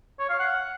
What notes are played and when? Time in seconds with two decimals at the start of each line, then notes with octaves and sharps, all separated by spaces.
0.19 C#5
0.29 F5
0.39 F#5